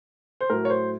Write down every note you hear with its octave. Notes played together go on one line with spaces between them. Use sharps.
C5
A2 F#3 A#4
C#5
C5